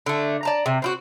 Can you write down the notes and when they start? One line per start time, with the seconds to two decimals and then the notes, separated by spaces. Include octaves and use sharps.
0.06 D3 A3
0.43 D5 A5 A#5
0.66 C3
0.82 C4 E4 F#4